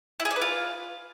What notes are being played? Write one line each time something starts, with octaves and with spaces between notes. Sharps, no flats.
E4
G#4
D5
B4
F4